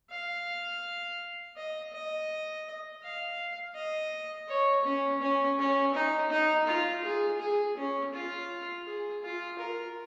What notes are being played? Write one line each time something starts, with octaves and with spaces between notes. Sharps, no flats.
F5
D#5
D#5
F5
D#5
C#5
C#4
C#4
C#4
D#4
D#4
F4
G#4
G#4
C#4
F4
G#4
F4
A#4